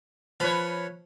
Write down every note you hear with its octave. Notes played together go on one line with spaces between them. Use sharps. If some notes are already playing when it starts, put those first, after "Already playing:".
F3 B4 C#5